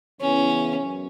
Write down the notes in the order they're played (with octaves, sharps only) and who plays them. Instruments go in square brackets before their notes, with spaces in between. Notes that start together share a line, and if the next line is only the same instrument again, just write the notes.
[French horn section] E2 C#3 E3 B3 [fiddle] C#4
[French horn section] F#2